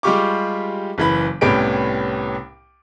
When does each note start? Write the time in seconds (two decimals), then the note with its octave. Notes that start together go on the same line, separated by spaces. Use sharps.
0.03 G3 G#3 F4 G4 C#6 D6
0.98 F#1 E3 B5
1.41 C2 A2 B3 C#4 G4 D7